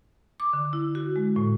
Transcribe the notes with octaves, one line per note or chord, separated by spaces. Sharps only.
D6
D3
E4
F#4
G#3
A2